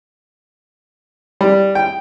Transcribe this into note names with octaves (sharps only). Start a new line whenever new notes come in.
G3
G5